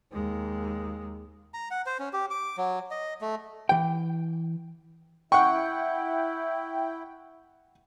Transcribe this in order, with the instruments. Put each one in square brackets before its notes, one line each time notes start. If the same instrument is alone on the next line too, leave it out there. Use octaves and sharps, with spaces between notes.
[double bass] D#2 G#3
[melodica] A#5
F#5
C5
C#4
G4
D6
F#3
D#5
A3
[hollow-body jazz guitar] E3 G5
[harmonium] E4 [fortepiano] F#5 C#6 [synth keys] G5